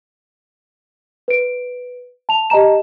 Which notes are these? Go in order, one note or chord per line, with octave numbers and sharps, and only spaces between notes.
B4 D7
A5 F7
G4 D#5 A5 A#5 E7